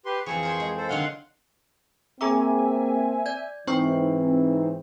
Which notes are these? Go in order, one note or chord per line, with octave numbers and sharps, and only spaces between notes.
G4 B4 C6
F2 E3 F3 G#4 C#6
A#4 C5 G5
G#3
A4 C5
D3 D#3 F#3 F5 F#5 C6
A#3 C4 G#4 E5 G#5 A#5 D6
D5 G#6
G#2 E3 C4 D#4 C5 G5 C#6